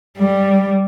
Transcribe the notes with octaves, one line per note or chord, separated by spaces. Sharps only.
G3